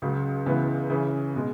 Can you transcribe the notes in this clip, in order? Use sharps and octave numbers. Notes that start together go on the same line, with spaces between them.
C#2 C#3 F#3
C#2 C#3 E3 B3 E4
C#3 E3 C#4
B2 G#3